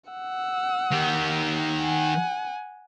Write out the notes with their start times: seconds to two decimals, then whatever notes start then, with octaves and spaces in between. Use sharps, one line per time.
0.11 F#5 E6
0.91 D#3 G4
1.82 F#5 G#5